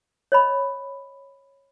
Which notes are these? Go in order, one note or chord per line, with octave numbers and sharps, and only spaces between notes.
C#5 D#5 B5